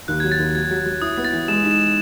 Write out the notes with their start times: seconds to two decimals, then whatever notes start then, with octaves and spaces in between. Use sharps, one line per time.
0.08 D#2 F#6
0.20 F#3 G#6
0.32 A6
0.39 D#2
0.55 F#3 G#6
0.71 F#3
0.86 F#3
1.02 E4 D#6
1.17 B3
1.25 A6
1.33 E3
1.48 G#3 E7
1.63 D#4
1.71 E7